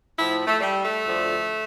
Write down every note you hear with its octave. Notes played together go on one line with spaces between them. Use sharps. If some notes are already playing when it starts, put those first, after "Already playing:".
A2 F3 E4
A3
G3
A3
D2 D3 F3